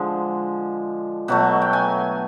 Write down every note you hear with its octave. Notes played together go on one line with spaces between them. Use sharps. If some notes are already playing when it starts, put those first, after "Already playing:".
Already playing: D3 F3 G#3
B2 F#3 A3 F#5
G5
G#5